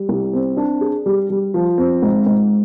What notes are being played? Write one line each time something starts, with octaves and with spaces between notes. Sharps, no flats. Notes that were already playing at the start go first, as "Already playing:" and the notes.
Already playing: G3
C2
C4
D4
G#4
G3
G3
F3
C4
G#2
G#2